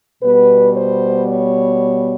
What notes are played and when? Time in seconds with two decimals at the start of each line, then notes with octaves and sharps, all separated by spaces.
0.22 B2 G3 B3 B4
0.74 C5
1.26 C#5